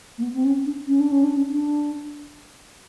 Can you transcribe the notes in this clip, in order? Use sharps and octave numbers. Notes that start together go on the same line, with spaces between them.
A#3
B3
C4
C#4
D4
C#4
D4
C#4
D4
C#4
D4